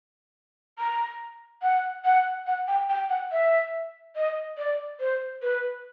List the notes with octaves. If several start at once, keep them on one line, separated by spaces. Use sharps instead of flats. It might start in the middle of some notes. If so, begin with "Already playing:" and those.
A#5
F#5
F#5
F#5
G5
G5
F#5
E5
D#5
D5
C5
B4